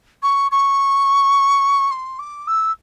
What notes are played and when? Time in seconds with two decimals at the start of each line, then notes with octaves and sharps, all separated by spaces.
0.23 C#6
0.51 C#6
1.91 C6
2.19 D6
2.47 E6